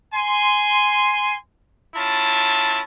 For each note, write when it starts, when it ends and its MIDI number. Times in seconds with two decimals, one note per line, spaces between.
0.14 1.34 80
0.14 1.34 84
1.95 2.80 61
1.95 2.80 64
1.95 2.80 65
1.95 2.80 81